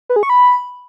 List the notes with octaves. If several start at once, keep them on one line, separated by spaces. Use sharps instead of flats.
B4
G#4
C#6
B5